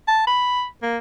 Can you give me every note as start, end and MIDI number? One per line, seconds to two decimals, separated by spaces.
0.08 0.26 81
0.27 0.65 83
0.82 0.98 58